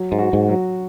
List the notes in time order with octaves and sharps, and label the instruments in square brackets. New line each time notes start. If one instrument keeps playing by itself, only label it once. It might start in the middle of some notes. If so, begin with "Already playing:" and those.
Already playing: [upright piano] F#3
[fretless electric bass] G#2
[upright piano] F#4
[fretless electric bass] G#2
[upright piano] F#3